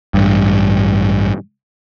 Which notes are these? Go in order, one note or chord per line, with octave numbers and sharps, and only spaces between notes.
A1 G2